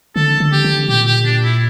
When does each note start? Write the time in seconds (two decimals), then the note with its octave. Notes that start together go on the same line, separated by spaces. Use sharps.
0.16 D3 A4
0.40 D3
0.52 G4
0.64 D3
0.89 A#2 G4
1.07 G4
1.25 D4
1.44 E4